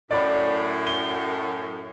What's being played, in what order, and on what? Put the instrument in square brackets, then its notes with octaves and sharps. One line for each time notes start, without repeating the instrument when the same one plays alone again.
[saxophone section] F#2 A2 [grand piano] D5 B5
[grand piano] G7